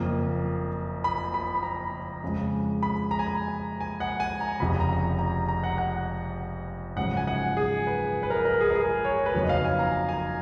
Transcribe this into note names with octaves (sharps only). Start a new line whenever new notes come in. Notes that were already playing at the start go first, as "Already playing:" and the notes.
Already playing: F#1 F2 F3 A#3
B5
B5
B5
A#5
F2 C#3 G#3
B5
A#5
G#5
A#5
G#5
F#5
G#5
A#5
F1 F2 C#3 B5
A#5
A#5
A#5
F#5
F#5
G#1 F#2 C#3 F3 F#5
G#5
F#5
G#4
B4
B4
A#4
A#4
G#4
A#4
G#4
C#5
B4
F#1 F2 D#3 F#3 C#5
D#5
F5
G#5
A#5
G#5
A#5